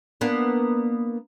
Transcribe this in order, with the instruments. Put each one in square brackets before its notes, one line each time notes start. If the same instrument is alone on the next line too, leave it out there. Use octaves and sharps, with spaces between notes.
[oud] A#3 B3 D4